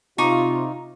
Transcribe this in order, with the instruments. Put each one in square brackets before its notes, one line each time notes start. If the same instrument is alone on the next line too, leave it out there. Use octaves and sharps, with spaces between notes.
[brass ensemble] C3 F4 [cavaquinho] D#4 C#6 D6